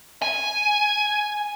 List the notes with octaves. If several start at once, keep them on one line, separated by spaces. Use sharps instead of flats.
G#5